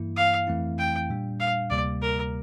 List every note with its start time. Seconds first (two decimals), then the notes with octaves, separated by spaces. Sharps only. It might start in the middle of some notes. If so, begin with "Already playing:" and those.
Already playing: G2 E3 A#3 E4
0.16 F5
0.47 F2 E3 A3 C4 E4
0.78 G5
1.10 A#2 G3 D4
1.40 F5
1.70 D2 C3 G3 A#3 D5
2.02 A#4